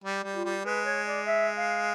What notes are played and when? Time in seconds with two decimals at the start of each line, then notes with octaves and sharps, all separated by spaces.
0.04 G3
0.24 G3
0.34 F4
0.45 G3
0.65 G#3 B4
0.86 C#5
1.07 D5
1.27 E5
1.57 F5